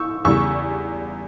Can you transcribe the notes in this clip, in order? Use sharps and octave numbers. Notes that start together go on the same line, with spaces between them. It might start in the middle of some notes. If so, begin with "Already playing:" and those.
Already playing: C#6 E6 G6
E2 C#3 E3 G3 C#6 E6